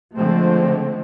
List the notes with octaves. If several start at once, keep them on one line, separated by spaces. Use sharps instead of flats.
D3 F3 G#3 A3 C4